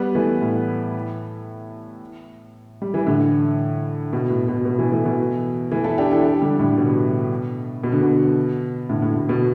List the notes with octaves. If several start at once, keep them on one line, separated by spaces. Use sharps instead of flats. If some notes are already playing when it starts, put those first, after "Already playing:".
Already playing: G3 B3
E3 A3
A2
G3
E3
A2 D3
B2
A2
B2
B2
B2 E3
E3 A3
B2 E3
E3 A3
E4 A4
D4 G4
E4 A4
D4 G4
D3 G3
A2 D3
B2
B2
D3
B2
A2 D3
A2
A2
B2